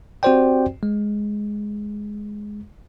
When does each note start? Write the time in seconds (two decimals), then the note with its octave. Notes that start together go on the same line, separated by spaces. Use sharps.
0.23 C4 F#4 G4 C5 D5 G5
0.83 G#3